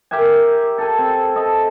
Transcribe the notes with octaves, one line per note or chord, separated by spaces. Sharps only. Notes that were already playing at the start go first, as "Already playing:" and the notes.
G4 A#4 E5 G#5
A4 G#5
C4
A4 D#5